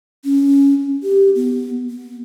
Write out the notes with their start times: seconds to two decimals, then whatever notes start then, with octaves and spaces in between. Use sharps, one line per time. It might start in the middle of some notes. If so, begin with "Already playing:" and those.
0.24 C#4
1.03 G4
1.35 B3
1.89 B3